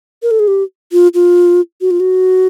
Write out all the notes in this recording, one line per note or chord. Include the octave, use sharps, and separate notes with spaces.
A#4
A4
G#4
G4
F4
F4
F#4
F4
F#4